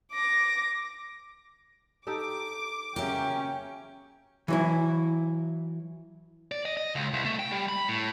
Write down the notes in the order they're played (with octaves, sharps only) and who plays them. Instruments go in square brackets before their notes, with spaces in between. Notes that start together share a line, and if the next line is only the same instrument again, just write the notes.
[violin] D6 A#6
[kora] D#4 G4 A4 [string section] D6
[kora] C#3 F#3 A#3 [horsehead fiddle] C#4 G5 [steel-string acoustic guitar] G4 E5
[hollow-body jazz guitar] E3 F#3 E4
[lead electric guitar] D5
D#5
D#5
C#2
C2
A3
G5
G3
B5
A2